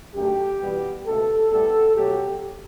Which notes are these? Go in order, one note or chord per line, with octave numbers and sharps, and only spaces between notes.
F#2 D3 A3 G4
E2 B2 G3 B3
C#2 B2 A3 A4
A2 G3 B3 A4
B2 F#3 A3 G4